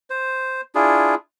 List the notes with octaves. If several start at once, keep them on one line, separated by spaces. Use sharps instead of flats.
C5
D4 E4 F4 G#4